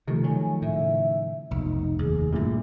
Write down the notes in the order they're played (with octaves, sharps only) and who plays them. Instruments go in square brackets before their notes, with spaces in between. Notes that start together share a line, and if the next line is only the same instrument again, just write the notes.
[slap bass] C3 [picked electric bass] D#3 F3 A3
[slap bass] F#3 [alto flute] G#5
[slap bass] A2 C#3 [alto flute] E5
[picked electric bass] F1 [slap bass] B1 [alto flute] D#4
[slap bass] D#2 [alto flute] G#4
[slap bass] G2 A3 [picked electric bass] A#2 D3 [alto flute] E4